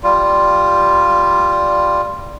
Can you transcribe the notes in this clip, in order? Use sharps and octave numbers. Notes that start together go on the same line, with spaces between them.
G3 F4